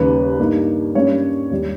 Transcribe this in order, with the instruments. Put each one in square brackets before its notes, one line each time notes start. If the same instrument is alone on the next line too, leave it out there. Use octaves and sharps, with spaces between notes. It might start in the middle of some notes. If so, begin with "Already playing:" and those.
Already playing: [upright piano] D#2 C#3 G3 B4
G2 G3 A#3 D#4
G2 G3 A#3 C#4 C#5
D#2 D#3 G3